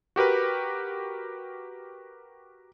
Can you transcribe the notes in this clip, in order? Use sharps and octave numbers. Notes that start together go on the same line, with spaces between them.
F#4 G4 A#4 B4